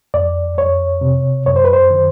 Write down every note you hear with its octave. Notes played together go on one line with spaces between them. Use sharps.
F2 D5
F2 C#5
C3
F#2 C#5
C5
B4
C5
D#3